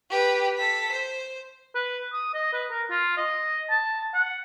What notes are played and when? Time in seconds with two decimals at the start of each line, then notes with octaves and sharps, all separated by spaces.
0.10 G4 B4
0.57 A4 B6
0.92 C5
1.75 B4
2.13 D#6
2.34 D#5
2.53 B4
2.70 A#4
2.90 F4
3.17 D#5
3.70 A5
4.14 F#5